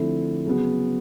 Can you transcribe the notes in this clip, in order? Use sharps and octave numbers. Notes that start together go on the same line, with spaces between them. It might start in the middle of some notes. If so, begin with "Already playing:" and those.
Already playing: D3 F3 A3 C4 E4
C#3 F#3 B3